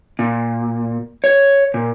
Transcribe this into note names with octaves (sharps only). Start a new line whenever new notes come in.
A#2
C#5
A#2